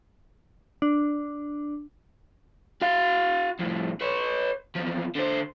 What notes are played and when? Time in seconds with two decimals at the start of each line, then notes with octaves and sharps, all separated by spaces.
0.82 D4
2.82 F#4 F5
3.60 F2 A2
4.01 B4 C#5
4.76 E2 F3
5.16 D3 C5